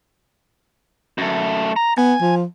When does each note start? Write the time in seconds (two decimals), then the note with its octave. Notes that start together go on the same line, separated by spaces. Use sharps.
1.18 F#2 A3
1.76 A#5
1.98 B3 G#5
2.21 F3